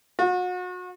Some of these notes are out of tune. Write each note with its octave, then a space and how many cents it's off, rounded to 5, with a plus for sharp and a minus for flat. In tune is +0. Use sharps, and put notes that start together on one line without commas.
F#4 -35